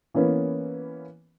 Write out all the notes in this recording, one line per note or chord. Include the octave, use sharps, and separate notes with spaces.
E3 A#3 B3 C#4